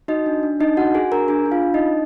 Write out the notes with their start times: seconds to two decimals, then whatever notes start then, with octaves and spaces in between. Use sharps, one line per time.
0.08 D#4 F#4 D#5
0.26 D4
0.43 D4
0.60 D4 D#4 D#5
0.77 F#4 F#5
0.94 F#4 G#4 G#5
1.12 D4 A#4 A#5
1.28 D4 G#4 G#5
1.46 D4
1.51 F4 F5
1.62 D4
1.74 D#4 D#5
1.80 D4